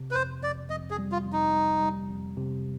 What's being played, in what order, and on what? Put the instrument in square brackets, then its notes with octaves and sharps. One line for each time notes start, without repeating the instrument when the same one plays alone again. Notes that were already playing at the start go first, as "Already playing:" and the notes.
Already playing: [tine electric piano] C3
[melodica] B4
[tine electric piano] F2 [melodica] C5
[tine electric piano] F2 [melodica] D5
[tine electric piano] F2 [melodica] D#5
[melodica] G#4
[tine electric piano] G3
[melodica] F4
[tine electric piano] F2
[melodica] D#4
[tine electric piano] G3
G3
F2
C3